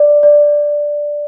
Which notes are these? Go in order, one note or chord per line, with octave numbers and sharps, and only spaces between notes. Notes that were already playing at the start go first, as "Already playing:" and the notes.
Already playing: D5
D5